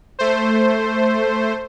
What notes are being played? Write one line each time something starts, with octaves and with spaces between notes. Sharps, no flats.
A3 C5